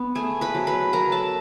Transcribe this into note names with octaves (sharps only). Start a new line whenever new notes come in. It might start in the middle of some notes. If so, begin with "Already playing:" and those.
Already playing: B3
A3 G#4 G#5
B4 B5
F#3
B4 B5
F#3 A#4 A#5
A4 A5